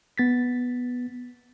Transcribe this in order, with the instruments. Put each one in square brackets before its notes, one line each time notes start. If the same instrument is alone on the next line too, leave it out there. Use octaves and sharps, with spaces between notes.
[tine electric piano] B3 A6 B6